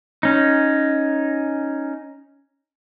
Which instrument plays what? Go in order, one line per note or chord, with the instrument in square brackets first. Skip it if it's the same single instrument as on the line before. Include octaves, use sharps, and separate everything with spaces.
[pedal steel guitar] C#4 D#4